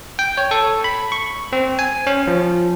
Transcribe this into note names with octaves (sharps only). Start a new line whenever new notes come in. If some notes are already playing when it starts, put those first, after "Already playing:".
G5
C#5
A4
B5
C#6
C4
G#5
C#4
F3